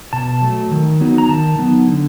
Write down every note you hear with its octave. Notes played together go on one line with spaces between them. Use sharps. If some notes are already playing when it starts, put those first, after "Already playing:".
B2 A5
F#3 A3
D#3
F#3 B3 D#4
A#5
D#3 A5
F#3 B3 D#4
D3